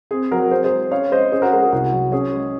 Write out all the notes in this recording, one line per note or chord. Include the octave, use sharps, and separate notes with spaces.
C4 G#4
F#3 F#4 A#4
C4 G#4 C5
G#4 C5
G#3
C#4 C#5 F5
G#3 C5 D#5
C#4 G#4 C5
F#4 A#4
G#3 F#4 A#4
G#4
C2 F#4
F#3
C#4 G#4
G#3